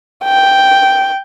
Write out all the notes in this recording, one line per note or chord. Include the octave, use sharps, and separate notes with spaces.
G5